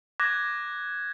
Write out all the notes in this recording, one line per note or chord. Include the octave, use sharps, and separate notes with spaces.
D6 F#6 G#6 A#6